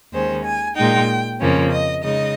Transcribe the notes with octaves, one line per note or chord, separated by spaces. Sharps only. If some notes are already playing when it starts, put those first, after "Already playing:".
D#2 D#3 G#3 C#4 C5
G#5
A#2 G#3 D#4 G5
F2 C#3 F3 A#3 C#4
D#5
C#3 G#3 D#4 D#5